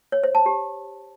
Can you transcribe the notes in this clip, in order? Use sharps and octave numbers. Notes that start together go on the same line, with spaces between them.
C#5
C5
A5
G4